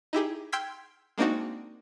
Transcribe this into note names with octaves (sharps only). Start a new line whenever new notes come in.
D#4 E4 G4 G#4
G5 C6 E6 F6 G#6 B6
G#3 A#3 C4 D4 D#4 F#4